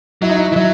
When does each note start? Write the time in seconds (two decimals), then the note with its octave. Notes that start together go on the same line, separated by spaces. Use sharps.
0.22 F#3 E4
0.29 D#4
0.37 E4
0.52 E3
0.56 F#3 E4